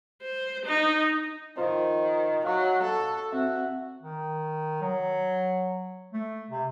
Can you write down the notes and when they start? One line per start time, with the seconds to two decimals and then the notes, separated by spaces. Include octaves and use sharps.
0.22 C5
0.65 D#4
1.57 D#3 F4 C5
2.45 F#3 F5 C#6
2.83 A4
3.32 C4 F#4 E5
4.02 D#3
4.82 F#3
6.13 A3
6.50 C3